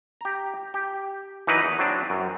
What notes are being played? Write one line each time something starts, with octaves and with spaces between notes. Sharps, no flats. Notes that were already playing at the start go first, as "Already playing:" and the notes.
G4 A#5
G4
E3 F#3 D#4 A#4 B4
E2
F#3 C4 D4
F#2